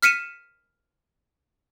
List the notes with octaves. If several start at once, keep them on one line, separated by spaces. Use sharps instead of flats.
F6 B6 C#7 D#7 E7